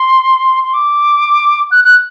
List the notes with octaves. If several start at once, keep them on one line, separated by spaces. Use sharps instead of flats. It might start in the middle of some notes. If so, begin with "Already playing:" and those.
Already playing: C6
C6
D6
F#6
F#6